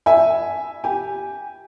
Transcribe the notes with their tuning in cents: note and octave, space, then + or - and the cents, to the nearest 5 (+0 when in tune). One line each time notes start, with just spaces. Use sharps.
E5 +0 G#5 +0
G4 -5 G#5 -10